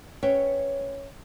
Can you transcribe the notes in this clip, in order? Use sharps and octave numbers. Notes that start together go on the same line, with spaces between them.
C#4 B4 C#5 E5 G5